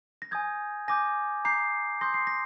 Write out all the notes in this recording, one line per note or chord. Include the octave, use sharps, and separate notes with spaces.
A#6
G#5 D#6 G6 G#6
G#5 D6 G6 A#6
A#5 D6 G6 C7
C6 D#6 G6 A#6
C7
A#6